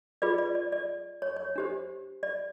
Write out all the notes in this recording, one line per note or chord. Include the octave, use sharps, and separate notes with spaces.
F4 G#4 B4 D5
D5
D5
D5
C#5
C#5
D4 G4 C5
D5